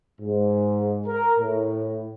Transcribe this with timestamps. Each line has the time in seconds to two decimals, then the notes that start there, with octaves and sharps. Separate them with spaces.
0.21 G#2
1.07 A#4
1.39 A2